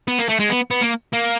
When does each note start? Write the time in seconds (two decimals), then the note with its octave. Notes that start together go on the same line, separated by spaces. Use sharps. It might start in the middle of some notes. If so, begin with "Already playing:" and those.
0.08 B3
0.19 A#3
0.29 A3
0.40 G#3
0.49 B3
0.71 B3
0.81 A#3
1.13 A#3